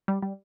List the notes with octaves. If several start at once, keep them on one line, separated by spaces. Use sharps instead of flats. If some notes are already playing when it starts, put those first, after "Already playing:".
G3
G3